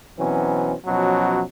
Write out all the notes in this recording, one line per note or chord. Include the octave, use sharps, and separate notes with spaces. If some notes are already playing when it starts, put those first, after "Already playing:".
B2 E3 F#3 C4 C#4
B2 F3 F#3 C#4